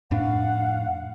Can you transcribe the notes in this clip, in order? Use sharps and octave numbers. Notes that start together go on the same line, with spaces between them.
F2 A2 D4 F5 F#5